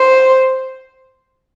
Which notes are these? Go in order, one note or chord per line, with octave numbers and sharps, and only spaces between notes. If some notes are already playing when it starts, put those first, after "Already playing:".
Already playing: C5